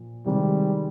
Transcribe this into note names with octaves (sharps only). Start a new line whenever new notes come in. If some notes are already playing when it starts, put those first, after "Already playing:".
Already playing: A#2 F3 A#3
C3 D#3 G3 G#3